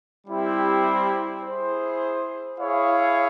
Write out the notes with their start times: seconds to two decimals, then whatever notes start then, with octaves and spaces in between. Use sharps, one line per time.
0.27 G3 C4 E4 G4
1.42 E4 G#4 C5
2.58 E4 G#4 C#5 F5